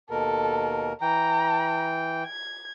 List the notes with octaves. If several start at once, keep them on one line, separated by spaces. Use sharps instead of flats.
D#2 B2 A4 A#4
E3 G5 A#5
G#6